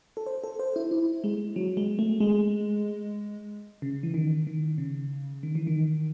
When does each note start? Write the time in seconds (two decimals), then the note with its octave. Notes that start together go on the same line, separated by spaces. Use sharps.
0.17 A4
0.26 C5
0.44 A4
0.59 C5
0.76 E4
0.91 E4
1.24 G#3
1.56 F#3
1.77 G#3
1.99 A3
2.20 G#3
3.82 C#3
4.03 E3
4.14 D#3
4.47 D#3
4.78 C#3
5.43 D#3
5.55 E3
5.67 D#3